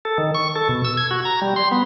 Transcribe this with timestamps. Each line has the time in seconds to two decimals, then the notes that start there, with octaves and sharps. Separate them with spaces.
0.05 A4
0.18 D#3
0.34 C#6
0.56 A4
0.69 B2
0.85 E6
0.97 G#6
1.11 F#4
1.25 A#5
1.42 G3
1.56 C6
1.71 B3